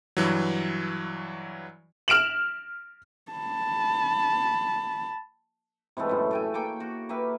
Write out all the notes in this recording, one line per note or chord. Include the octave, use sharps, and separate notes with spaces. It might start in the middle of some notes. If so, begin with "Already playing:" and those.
G2 E3 F#3
F6 D7 E7 F#7
A5 B5
C3 E3 G#3 A3
F#2 A2
A3 G5 G#5
A#3 G5 C#6 D6
F#4
A#3 G4 B4 E5